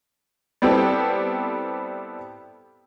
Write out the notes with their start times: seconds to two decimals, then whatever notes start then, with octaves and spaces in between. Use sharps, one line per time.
0.62 G3 B3 C4 E4 G4 A4